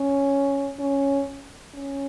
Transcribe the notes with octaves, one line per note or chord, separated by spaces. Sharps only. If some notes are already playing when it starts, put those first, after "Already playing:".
Already playing: C#4
C#4
C#4